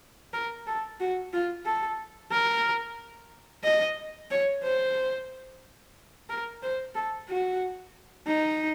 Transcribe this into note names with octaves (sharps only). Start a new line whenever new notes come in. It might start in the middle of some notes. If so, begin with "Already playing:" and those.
A#4
A4
F#4
F4
A4
A#4
D#5
C#5
C5
A#4
C5
A4
F#4
D#4